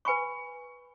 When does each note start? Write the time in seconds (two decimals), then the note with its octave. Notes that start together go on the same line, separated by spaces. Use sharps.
0.05 B4 G#5 B5 C#6